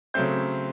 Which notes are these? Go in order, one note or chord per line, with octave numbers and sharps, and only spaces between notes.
C#3 F#3 A3 C4 G6